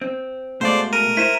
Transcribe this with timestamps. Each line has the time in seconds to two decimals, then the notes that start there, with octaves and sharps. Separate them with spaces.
0.01 C4
0.61 B2 G#3 A3 C5 D5 F5
0.93 A#4 D#7
1.17 E4 C5 B6 D#7 E7